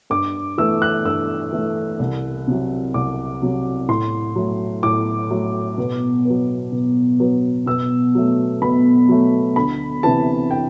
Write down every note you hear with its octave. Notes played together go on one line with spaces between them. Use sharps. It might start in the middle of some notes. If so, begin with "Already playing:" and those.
G2 D6
E3 A3 E6
F#6
G2 E6
E3 A3
C2
C3 F#3
C2 D6
C3 F#3
A2 C6
F#3 A3
A2 D6
F#3 A3
B2
F#3 B3
B2
F#3 B3
B2 E6
F#3 A3
B2 B5
F#3 A3
D2 B5
C3 E3 A5
G5